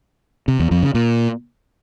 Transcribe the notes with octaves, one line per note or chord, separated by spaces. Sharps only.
C3
E2
F2
C#3
A#2